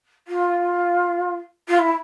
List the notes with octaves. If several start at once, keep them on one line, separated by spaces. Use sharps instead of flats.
F4
F4
E4